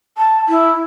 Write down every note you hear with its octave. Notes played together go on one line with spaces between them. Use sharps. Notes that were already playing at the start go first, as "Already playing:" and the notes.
A5
E4